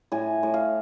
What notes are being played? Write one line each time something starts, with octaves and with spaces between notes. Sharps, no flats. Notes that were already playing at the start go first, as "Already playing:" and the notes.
A2 G#5
A2
F5